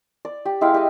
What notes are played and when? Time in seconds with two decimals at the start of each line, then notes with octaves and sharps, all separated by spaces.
0.25 D5
0.45 G4
0.61 G#3 E4 F5 G5
0.74 G4 D#5